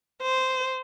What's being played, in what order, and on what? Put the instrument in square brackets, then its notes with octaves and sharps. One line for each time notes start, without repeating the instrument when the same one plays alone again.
[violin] C5